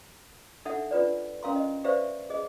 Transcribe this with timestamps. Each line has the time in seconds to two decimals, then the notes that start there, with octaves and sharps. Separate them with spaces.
0.65 D4 D#4 A4 E5 F#5
0.91 D4 F4 B4 D5
1.43 C#4 A#4 F5 A#5 C6
1.56 D#5
1.84 G4 B4 C5 D5 E5 F5
2.30 G#4 D#5